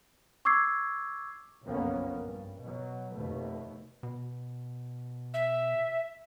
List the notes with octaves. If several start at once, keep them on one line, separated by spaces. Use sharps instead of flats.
C#6 D6 E6 G#6 C7
F#1 B1 F2 A#3 B3 C#4
G2
B2 F#3
F1 D#2 B2 A3
B2
E5